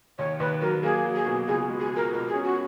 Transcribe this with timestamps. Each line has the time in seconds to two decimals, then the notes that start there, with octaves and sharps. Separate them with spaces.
0.18 D#2 C#5
0.40 D#2 B4
0.61 F#3 A#4
0.83 A#3 G#4
1.05 F#3
1.15 G#4
1.26 B2
1.48 C#2 G#4
1.69 G#3
1.80 G#4
1.90 F3
1.96 A#4
2.12 B2 A#4
2.29 G#4
2.34 C#4
2.44 F#4